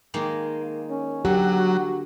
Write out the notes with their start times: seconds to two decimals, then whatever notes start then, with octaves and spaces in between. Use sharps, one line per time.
0.14 D#3 G#3 A#3
0.90 C#4
1.25 D3 F#3 G4
1.53 F#4